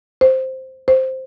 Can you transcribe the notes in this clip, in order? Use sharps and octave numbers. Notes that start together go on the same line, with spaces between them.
C5
C5